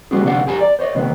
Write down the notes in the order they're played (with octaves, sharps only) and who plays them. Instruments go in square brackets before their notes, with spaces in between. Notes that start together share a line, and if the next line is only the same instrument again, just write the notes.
[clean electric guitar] G3 A#3 B3 C#4 F#4 G#4
D2 C3 D4 F5 F#5
F#2 G4 G#5 A#5
D5
C5 C#5 D#5
C3 D#3 A#3 B3